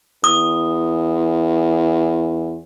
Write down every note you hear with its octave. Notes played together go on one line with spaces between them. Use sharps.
E2 D#6